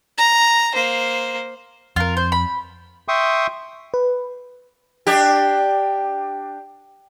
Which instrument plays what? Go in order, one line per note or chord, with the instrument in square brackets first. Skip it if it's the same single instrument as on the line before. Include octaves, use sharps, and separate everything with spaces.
[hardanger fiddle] A#5
A#3 C5
[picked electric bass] F2 [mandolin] F4 A#4
[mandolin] C5
B5
[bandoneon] E5 G5 C6 C#6 D#6
[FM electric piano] B4
[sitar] D4 G4